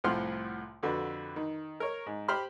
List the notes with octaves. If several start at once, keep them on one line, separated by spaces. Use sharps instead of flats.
C2 A2 F3 F#5 C6 F6
F2 D3 F#4 B4
D#3
A#4 C#5
G#2
G4 C5 B5 F6